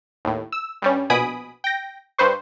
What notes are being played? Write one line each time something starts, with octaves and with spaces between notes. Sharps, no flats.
D#2 A2
E6
G2 G3 C#4
A#1 B2 G#5 B5 D#6 D7
G5 A#6
G2 B4 C5 C#6